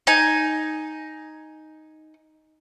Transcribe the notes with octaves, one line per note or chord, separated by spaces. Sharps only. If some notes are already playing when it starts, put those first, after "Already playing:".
D#4 G#5